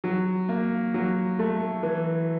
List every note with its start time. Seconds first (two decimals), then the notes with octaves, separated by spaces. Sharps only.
0.04 F#3
0.49 A#3
0.94 F#3
1.39 A3
1.83 E3